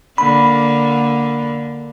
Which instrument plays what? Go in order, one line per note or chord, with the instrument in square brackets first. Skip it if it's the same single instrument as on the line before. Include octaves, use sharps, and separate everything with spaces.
[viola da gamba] D3 A#3 [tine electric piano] B5